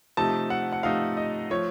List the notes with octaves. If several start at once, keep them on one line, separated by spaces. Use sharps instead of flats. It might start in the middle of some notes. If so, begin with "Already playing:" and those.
C3 F3 A3 D#4 A5
F#5
F#5
C3 F3 A3 D#4 F5
D#5
F3 A3 C#5